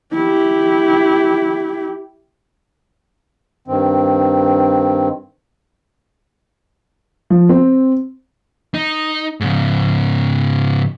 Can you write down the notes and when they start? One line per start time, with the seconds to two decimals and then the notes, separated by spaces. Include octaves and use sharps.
0.14 E4 G4
3.68 G2 D#3 C4
7.30 F3
7.49 C4
8.74 D#4
9.41 G#2 C#3